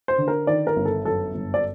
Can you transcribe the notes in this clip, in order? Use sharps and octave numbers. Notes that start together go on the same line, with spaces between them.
C5
D3
A#4
D#3 D5
A#4
G1
A4
F#2 A4
G1
D5